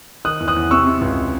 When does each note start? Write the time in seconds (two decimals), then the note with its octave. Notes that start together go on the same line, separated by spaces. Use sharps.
0.25 D#3 D#6 F#6
0.40 E2
0.48 D#6 F#6
0.56 E2
0.71 C3 C#6 E6
0.87 C3
1.01 C#2